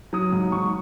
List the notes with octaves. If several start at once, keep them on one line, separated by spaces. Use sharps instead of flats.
F#3 D#6
G#2 D#6
G#2 C#6